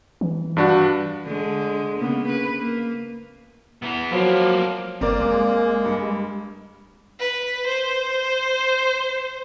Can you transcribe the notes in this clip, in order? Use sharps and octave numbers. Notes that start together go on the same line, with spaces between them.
E3
G2 D4 F#4
D3 G#3
C#3 A#3 B3
B4
A#3
E3 B3
F3 F#3 A#3 B4
G1 A#3 C4 A#4 D5
G#3
G2
B4
C5